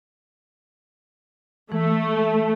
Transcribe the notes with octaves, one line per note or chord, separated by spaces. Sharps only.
E3 A3